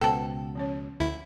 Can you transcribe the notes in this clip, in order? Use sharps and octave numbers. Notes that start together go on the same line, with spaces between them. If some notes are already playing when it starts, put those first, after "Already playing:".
C#2 B2 A4 B4 C5 F#5 G5 A5
F3 C#4 C#5
D2 E4